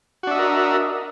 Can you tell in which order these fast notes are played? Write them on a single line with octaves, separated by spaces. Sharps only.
F#4 D4 E5 D#5 A#4